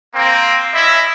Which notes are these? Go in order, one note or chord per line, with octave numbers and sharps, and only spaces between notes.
A#3 C4
C#4 E4 D#5 E5